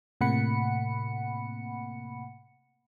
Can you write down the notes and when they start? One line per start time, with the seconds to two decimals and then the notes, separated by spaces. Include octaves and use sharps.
0.21 A2 C3 A#3 F#5 B5 C#7